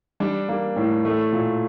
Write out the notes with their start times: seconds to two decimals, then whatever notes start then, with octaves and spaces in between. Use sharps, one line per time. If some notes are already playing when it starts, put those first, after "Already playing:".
0.20 G3 D4
0.49 A#3
0.76 A2
1.05 A3
1.33 A#2